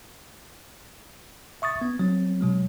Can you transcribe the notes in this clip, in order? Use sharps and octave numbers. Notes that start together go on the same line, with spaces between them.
E5 C#6 D#6 A6
B3
F#3 C4
B2 F#3 G#3